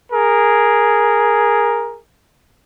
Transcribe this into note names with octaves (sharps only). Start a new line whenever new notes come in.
G#4 A#4